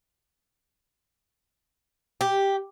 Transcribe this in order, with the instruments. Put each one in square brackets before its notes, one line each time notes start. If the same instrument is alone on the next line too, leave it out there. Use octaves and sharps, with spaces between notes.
[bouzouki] G4